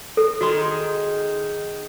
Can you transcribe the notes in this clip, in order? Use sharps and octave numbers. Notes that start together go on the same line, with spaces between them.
A4
D#3 F#4 G#4 C6